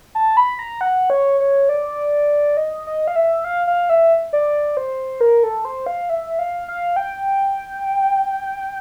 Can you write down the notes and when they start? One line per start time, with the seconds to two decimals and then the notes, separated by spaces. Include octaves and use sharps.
0.15 A5
0.37 B5
0.59 A#5
0.81 F#5
1.10 C#5
1.40 C#5
1.69 D5
2.57 D#5
2.87 D#5
3.07 F5
3.16 E5
3.45 F5
3.67 F5
3.90 E5
4.33 D5
4.77 C5
5.21 A#4
5.44 A4
5.65 C5
5.86 F5
6.10 E5
6.39 F5
6.68 F5
6.96 G5